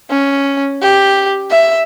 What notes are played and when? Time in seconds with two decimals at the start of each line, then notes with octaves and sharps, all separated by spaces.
0.10 C#4
0.82 G4
1.51 E5